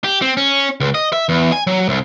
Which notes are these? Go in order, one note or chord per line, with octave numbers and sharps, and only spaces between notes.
G4
C4
C#4
C#2
D#5
E5
E2
G#5
F#3
C2